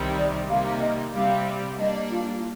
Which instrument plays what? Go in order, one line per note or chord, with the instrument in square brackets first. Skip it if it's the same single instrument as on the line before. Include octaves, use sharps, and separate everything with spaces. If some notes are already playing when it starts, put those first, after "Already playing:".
Already playing: [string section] C2 C3 D#3 G3 C4
[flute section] D5
[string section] C3 G3 A#3 D#4 [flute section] F5
[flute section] D#5
[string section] C3 G3 C4 [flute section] F5
[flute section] F5
[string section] G3 A#3 D4 [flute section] D#5
[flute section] F4
F4